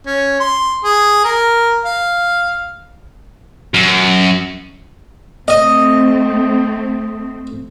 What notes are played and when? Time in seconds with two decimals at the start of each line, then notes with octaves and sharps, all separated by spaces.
0.06 C#4
0.40 C6
0.84 G#4
1.24 A#4
1.85 F5
3.74 F#2
5.48 A3 C4 D#5